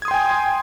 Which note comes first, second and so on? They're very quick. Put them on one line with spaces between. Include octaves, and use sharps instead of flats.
G#6 D#6 C6 G5 G#5